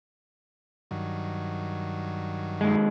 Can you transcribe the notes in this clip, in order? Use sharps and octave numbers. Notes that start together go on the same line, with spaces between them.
G2 D#3 F#3
D#2 G#3